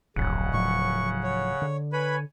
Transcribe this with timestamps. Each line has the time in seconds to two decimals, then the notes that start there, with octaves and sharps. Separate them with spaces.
0.16 D1 A#1 G2 C#3 F#3 F#5
0.53 A2 F3 F#3 C#6
1.23 C#5
1.62 D3
1.93 B4 C#5 G#5 B5